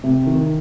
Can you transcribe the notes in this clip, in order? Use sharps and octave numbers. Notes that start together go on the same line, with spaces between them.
C3
D#3